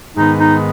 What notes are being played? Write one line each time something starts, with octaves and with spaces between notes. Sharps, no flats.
G#2 D#3 B3 D#4
D#4